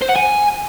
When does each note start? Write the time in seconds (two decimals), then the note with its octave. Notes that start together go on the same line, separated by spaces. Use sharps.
0.01 C5
0.09 F#5
0.16 G#5